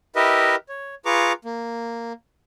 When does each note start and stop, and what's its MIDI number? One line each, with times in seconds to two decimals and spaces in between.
0.16 0.55 64
0.16 0.55 67
0.16 0.55 70
0.16 0.55 71
0.16 0.55 75
0.16 0.55 76
0.69 0.95 73
1.05 1.33 65
1.05 1.33 68
1.05 1.33 71
1.05 1.33 82
1.05 1.33 85
1.05 1.33 86
1.45 2.13 58